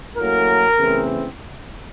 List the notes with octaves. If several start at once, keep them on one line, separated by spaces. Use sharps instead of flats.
A2 F#3 A#3 C#4 A#4
E2 C#3 E3 A3 C4